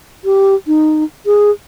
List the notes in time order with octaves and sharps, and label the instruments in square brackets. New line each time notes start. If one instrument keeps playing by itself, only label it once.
[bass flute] G4
D#4
G#4